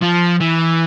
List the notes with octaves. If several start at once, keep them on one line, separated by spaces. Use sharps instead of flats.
F3
E3